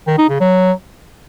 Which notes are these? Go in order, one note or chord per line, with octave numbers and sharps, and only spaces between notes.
D#3
D#4
C#3
F#3